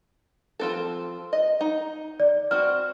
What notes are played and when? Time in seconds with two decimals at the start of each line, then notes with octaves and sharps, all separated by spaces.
0.59 F3 C4 A4
1.33 D#5
1.61 D#4
2.20 D5
2.51 C4 F#4 F6